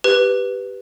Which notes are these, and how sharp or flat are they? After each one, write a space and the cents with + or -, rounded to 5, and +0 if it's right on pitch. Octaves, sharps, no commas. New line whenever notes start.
G4 +0 B4 +0